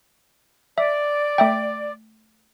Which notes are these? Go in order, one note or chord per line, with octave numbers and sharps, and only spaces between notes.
D5 E5
A3 E5 G5